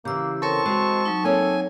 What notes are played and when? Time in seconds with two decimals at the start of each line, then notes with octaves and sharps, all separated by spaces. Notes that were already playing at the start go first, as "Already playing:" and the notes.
0.05 C#3 E3 A#3 G4 E6
0.42 C4 A4 A#4 C#5 A5 C#6
0.66 G#3 F#4 G#4 C5 D#5
1.05 F#3 D#4
1.24 A#3 C4 A4 C#5 G#5